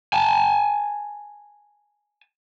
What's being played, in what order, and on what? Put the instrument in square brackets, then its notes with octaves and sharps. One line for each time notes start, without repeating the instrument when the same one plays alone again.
[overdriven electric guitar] G#5 A5